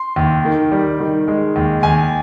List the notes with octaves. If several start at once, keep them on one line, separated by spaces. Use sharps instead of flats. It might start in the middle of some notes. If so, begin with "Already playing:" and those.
Already playing: C6
D#2
D#3
G3
D#3
G#3
D#2
D#2 G#5